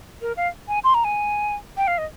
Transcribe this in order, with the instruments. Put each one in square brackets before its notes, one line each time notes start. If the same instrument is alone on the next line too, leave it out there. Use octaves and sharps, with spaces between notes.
[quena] A#4
F5
G#5
C6
A#5
G#5
G5
F5
D#5